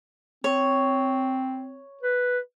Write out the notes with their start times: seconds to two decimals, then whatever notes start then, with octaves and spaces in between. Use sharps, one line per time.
0.44 C4 C#5
2.03 B4